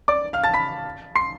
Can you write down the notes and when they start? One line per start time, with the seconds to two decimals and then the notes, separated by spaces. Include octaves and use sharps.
0.08 D5 D6
0.33 F5 F6
0.44 A5 A6
0.54 B5 B6
1.15 C6 C7